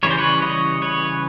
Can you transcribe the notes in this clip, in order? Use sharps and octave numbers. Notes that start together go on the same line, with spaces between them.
C#3 E3 G3 C#5
C5
B4 C#5
C#5 D#5
B4 C#5